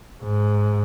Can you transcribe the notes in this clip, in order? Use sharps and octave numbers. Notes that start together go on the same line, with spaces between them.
G#2